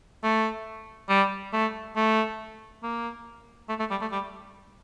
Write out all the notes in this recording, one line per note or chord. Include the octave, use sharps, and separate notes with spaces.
A3
G3
A3
A3
A#3
A3
A3
G3
A3
G3